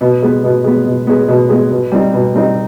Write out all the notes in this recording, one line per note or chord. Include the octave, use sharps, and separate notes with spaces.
B2
G#3 B3
B2
G#3 B3
B2
G#3 B3
B2
G#3 B3
B2
G3 C4 D#4
B2
G3 C4 D#4